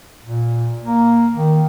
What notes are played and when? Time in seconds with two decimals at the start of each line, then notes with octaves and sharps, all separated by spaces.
0.25 A#2
0.84 A#3
1.34 D#3